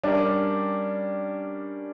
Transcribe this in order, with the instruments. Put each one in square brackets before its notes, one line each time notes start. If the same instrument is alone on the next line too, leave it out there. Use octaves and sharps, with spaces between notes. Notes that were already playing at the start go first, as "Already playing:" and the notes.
[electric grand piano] G3 C#4 G4 A#4 [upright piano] D4